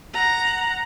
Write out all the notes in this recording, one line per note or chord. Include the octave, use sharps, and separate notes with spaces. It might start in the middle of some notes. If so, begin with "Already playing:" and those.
F#5 A#5